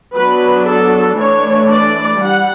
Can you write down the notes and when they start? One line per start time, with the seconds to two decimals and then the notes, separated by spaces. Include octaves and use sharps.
0.16 F#3 B3 D4 B4
0.68 A4
1.20 E3 A3 D4 C#5
1.71 D5
2.23 G3 F#5